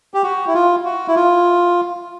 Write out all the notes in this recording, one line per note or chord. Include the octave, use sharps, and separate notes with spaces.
G4
F#4
E4
F4
F#4
E4
F4